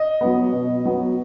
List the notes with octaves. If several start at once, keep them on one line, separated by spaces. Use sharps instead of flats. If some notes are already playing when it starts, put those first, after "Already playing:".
Already playing: D#5
F#3 B3
B2
F#3 B3